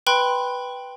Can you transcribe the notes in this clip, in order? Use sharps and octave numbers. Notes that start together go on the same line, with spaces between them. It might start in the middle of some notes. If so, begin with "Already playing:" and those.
B4 G5 B5 C6 F#6